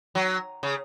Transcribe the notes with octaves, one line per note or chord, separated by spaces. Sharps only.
F#3
C#3